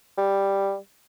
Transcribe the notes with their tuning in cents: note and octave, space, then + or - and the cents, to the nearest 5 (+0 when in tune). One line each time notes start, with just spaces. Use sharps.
G3 +5